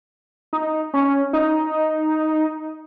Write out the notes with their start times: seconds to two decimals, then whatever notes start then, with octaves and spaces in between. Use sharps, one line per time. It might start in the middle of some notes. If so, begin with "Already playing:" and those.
0.53 D#4
0.94 C#4
1.33 D#4